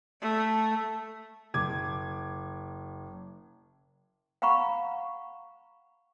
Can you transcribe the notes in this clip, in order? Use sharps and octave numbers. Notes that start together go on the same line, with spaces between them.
A3
F#1 D6 G#6
F5 F#5 A#5 B5 C#6